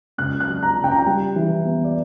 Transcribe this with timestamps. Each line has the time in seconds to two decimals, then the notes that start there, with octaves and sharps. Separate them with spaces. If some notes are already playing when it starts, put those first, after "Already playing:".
0.18 C#2 F#6
0.40 F#6
0.48 F#3
0.63 A#5
0.77 C#3
0.84 G5
0.92 A#5
0.99 G5
1.06 G3
1.36 E3
1.65 B3
1.84 D5